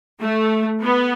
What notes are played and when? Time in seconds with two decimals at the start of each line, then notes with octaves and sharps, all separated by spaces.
0.21 A3
0.83 B3